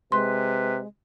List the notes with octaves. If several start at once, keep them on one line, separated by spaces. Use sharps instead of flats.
C3 G#3 B4 C6